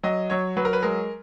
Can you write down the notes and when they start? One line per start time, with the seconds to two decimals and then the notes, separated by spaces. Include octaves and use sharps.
0.03 F#3 D#5
0.30 F#3 C#5
0.57 F#3 B4
0.65 A#4
0.73 B4
0.83 G#3 A#4